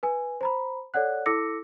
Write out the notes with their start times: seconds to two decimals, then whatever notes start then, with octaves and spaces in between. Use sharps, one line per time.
0.03 B4 G#5
0.41 C5 A#5 B5
0.94 A4 C#5 D5 F#5 F#6
1.26 E4 A4 D6 E6 A#6 C#7